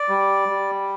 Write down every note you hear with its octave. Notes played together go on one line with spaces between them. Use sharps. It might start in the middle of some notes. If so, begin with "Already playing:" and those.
Already playing: D5
G3
G3